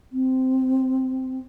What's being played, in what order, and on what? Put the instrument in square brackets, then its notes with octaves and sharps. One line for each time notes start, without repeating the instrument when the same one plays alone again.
[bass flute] C4